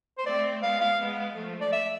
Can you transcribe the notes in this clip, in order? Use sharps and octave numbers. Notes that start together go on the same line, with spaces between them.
C5
A3 C4 D5
G#3 B3 F5
F5
G#3 B3
F3 A3
D5
E5